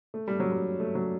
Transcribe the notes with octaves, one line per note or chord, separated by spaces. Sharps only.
A3
G3
F#3
G3
A3
F#3